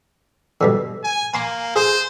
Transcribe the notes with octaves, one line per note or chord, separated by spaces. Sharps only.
G2 B2 D3
G#5
A#3 G#5 C6
G#4 C5